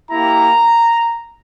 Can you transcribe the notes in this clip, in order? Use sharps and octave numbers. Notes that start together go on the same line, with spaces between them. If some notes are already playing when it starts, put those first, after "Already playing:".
A#3 E4 G4 A#5